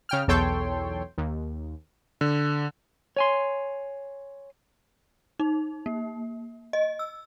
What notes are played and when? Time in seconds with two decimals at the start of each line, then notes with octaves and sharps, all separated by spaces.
0.09 C#3 G5 F6
0.28 B1 E2 A4 C#5 G5 C6
1.18 D#2
2.21 D3
3.16 C#5 G#5 C6
5.40 D#4
5.86 A#3
6.73 D#5
6.99 E6